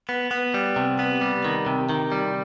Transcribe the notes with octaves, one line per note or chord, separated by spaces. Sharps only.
B3
B3
G3
C3
B3
G3
D#3
C3
D#3
G3